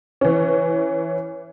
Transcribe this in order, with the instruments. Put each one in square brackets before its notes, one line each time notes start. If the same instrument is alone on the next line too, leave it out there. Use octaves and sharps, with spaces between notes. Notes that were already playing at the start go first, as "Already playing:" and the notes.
[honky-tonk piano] E3 C#4